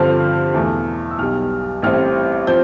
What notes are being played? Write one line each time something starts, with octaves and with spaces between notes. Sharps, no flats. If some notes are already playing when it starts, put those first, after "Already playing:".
Already playing: G2 D3 F3 C4 F6
E2 B2 A3
E6
B1 B2 G3 F6
A1 A2 G3 C4 F6
F3 C4 G6